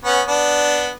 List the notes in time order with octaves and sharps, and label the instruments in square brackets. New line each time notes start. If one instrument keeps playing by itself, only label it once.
[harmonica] B3 C#4
B3 D4